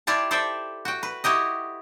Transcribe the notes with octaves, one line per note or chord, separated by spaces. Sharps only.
E4 F4 G4 D5 A5
A4 C5 D5 E5 G5
F#4 G5
B4
E4 F#4 G4 D#5